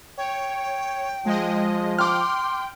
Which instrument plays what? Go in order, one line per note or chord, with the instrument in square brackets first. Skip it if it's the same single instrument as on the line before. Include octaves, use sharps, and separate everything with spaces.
[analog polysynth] C#5 [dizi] G5
[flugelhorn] F3 [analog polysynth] G#3 D#5
[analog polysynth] G5 [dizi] C6 [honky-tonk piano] D6 F6